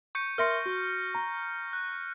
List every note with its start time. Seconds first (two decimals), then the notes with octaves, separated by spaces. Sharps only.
0.15 C#6 G6 C#7
0.38 A#4 E5 C6 F6 A#6 C#7
0.66 F#4
1.15 A#5
1.73 F#6